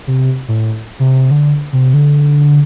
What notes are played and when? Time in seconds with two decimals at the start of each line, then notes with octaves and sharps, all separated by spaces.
0.07 C3
0.48 A2
1.00 C3
1.31 D3
1.73 C3
1.94 D3